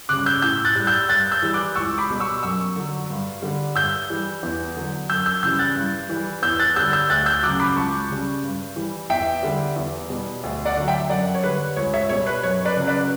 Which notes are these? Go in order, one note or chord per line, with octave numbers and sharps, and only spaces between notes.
C#3 G3 D6 F#6
E6 G6
A2 E6 G6
F#6 A6
G3
E6 G6
G2 F#6 A6
E6 G6
E3 G3
D6 F#6
C#2 C#6 E6
B5 D6
B2 G3
C#6 E6
F#2 C#6 E6
D3 F#3
G2
D3 G3
G2 E6 G6
E3 G3
E2
D3 F#3
F#2 E6 G6
E6 G6
C#3 E3 G3 E6 G6
F#6 A6
G2
E3 G3
E2 E6 G6
F#6 A6
D3 G3 E6 G6
E6 G6
D2 F#6 A6
E6 G6
C#3 F#3 D6 F#6
B5 D6
C#2 A5 C#6
C#3 G3
G2
E3 G3
E2 E5 G5
D3 G3
E2
B2 G3
D2
D5 F#5
D3 F#3
E5 G5
F#2 D5 F#5
C#5
D3 G3 B4
C#2 C#5
C#5 E5
B2 G3 C#5
B4
F#2 C#5
B4 D5
C#3 F#3
B4 D5